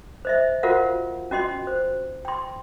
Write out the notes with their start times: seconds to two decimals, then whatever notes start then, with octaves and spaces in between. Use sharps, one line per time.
0.25 C5 D#5 E5
0.63 F4 F#4 A#4 C5 F5 F#5
1.31 C#4 F#4 D#5 C6
1.67 C5
2.25 G5 C6